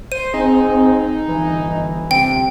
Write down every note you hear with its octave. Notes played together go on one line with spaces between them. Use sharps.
C5 D#7
C4 D#4 G#4
G1 E3
C3 G5